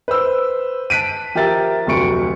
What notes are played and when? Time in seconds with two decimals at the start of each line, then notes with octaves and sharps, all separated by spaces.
0.08 B4 C5 E6
0.90 A5 F#6 B6 D7 D#7
1.35 F3 G4 A#4 E5 A6
1.87 F1 D2 F#3 C#6 C#7 D7